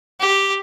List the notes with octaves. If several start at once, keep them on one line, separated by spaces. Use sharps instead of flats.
G4